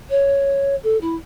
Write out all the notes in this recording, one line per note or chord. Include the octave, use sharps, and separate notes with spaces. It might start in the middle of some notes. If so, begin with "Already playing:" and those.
C#5
A4
E4